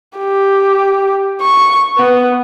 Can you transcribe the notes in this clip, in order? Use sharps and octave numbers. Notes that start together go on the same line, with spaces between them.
G4
C#6
B3